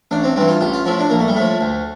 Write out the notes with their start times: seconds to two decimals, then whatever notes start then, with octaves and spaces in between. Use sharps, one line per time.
0.11 A1 D4
0.24 C4
0.36 G2 E3 C4
0.48 F4
0.61 A1 G4
0.73 F4
0.86 A2 F3 E4
0.99 D4
1.10 A#1 A#3
1.20 A3
1.28 G3
1.35 A2 F3 A3
1.61 D2